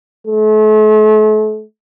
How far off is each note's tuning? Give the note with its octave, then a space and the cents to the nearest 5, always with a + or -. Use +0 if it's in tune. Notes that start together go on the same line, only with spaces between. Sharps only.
A3 -40